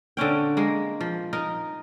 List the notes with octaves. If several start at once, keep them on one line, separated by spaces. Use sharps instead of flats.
D3 C4 C#4 G5
G#3 A#3
F3
D#4 A#4